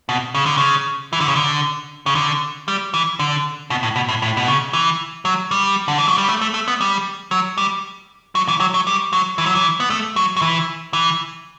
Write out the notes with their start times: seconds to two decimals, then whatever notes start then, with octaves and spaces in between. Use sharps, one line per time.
0.09 B2
0.35 C#3
0.46 D3
0.57 C#3
1.13 E3
1.20 D3
1.28 C#3
1.35 D3
2.06 C#3
2.15 D3
2.68 G3
2.94 E3
3.19 D3
3.70 B2
3.83 A2
3.96 B2
4.09 A2
4.22 A2
4.37 B2
4.48 C#3
4.73 E3
5.25 F#3
5.51 G3
5.88 D3
5.98 E3
6.08 F#3
6.18 G3
6.28 A3
6.41 A3
6.54 A3
6.68 B3
6.81 G3
7.31 F#3
7.58 G3
8.35 F#3
8.48 E3
8.60 F#3
8.74 F#3
8.87 G3
9.13 F#3
9.38 E3
9.46 F#3
9.55 E3
9.80 B3
9.90 A3
10.16 F#3
10.36 F#3
10.42 E3
10.93 E3